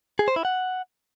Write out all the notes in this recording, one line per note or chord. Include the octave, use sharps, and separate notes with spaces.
G#4
C5
E4
F#5